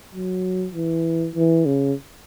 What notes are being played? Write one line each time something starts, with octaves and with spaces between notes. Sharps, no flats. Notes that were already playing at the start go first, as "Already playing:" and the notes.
F#3
E3
E3
C#3